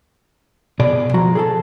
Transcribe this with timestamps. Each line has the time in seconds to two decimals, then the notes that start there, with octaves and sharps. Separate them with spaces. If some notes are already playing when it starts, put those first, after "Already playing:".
0.80 B2 G#4 D5
1.14 F3 F#4 A#5
1.35 G#4 A4 A5